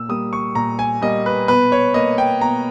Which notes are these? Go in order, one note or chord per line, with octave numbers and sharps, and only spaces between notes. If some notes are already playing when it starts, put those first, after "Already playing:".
Already playing: A#2 E6
G3 A#3 D#6
C#6
A#2 A#5
G#5
G3 A#3 D#5
B4
B2 B4
C#5
A#3 D#5
G5
B2 A#5